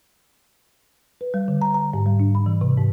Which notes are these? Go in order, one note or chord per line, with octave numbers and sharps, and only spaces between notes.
B4
G3
D3
A#5
A#5
G#2
G3
D4
B5
E3
C3
G#2